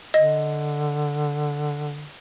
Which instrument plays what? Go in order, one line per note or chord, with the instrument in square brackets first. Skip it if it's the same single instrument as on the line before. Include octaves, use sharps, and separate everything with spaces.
[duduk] D3 [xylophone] D#5